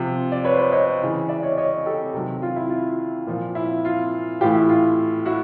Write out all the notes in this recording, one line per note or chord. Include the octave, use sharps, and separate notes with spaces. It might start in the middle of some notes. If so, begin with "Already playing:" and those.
Already playing: C3 F3
D5
B4 C#5
C5
B4 C#5
C#5 D#5
C#3 E3
D5 E5
C#5 D#5
C#5 D#5
G4 A4
C3 D#3 F#3
F4
E4
F4
A#2 F3
E4
F4
A2 E3 F4 G4
E4
F4
E4 F#4